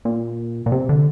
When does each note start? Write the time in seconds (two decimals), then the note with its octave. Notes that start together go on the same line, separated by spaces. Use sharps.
0.05 A#2
0.66 A#2
0.72 C3
0.89 D3